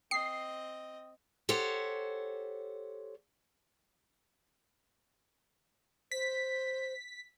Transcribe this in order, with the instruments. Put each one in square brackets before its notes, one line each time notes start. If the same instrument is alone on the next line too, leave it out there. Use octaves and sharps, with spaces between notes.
[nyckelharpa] C4 D#5 [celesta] G5 D#6 [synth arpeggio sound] C7
[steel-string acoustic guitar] G4 A4 C5 C#5 F#5
[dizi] C5 [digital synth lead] B6